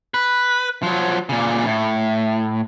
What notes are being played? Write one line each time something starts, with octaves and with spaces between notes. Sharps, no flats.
B4
F3 F#3
A#2 C#3
A2